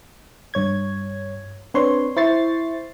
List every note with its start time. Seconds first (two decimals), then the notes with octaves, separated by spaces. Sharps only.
0.54 G2 C#5 G#6
1.74 C4 D4 B4 C#5 C6
2.16 E4 C5 C#6 A6 C7